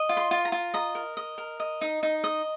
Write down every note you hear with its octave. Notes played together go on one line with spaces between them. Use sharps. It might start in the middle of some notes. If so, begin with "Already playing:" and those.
Already playing: D#5
F4
C6
F4
A#5
F4
D#5 A#5
A#4
D#5
A#4
D#5
D#4
D#4
D#5